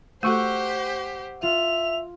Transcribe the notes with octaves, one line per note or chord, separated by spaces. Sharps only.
A3 F#4 G4 A4 C5 F#5 C#6 E6
F4 E5 F7